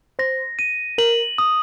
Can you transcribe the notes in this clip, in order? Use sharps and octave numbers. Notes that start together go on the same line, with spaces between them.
C5 A#6
D#7
A#4 F#7
D#6